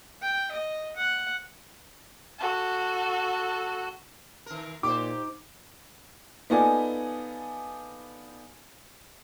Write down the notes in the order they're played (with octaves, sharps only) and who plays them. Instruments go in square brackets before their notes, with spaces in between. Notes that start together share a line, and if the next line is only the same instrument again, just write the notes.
[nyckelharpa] G5
D#5
F#5
[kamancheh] F#4 A4
[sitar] D#3 A#4
[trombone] A#2 [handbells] D#4 [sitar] G4 C5 [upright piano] D6
[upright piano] B3 D#4 F4 A4 D5 G#5